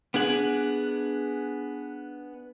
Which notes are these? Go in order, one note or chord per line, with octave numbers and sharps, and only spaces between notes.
B3 D4 G#4 F#5